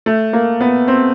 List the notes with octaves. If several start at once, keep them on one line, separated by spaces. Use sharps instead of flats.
A3
A#3
B3
C4